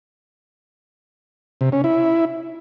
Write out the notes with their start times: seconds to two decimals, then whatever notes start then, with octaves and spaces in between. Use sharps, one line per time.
1.61 C3
1.72 C#4
1.84 E4